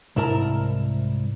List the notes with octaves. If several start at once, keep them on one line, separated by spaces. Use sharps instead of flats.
C2 G#2 E4 A#4 A5 A#5